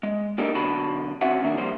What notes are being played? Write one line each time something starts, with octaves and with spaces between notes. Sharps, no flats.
G#3
A#3 D4 D#4 G4 A4 A#4
B1 D3 F#4 A5 B5
C4 C#4 F#4 E5 F#5
F#2 A#2 D3 D#3 A#3 D4
F3 G3 A#3 C5